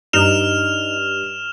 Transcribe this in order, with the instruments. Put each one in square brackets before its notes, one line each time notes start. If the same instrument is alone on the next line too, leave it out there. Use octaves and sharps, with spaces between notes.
[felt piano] G2 [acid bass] D#4 [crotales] F6 E7 F7